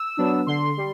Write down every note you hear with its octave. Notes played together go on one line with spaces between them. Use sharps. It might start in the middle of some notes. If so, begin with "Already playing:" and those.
Already playing: E6
F#3 B3 D4
D3 C6
G3